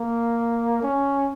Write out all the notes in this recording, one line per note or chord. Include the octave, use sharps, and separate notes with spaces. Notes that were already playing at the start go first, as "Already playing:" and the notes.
Already playing: A#3
C#4